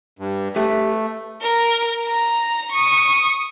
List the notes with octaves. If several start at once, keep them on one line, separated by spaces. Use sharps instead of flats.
G2
A3 G4 B4 E5
A#4
A#5
C#6 D#6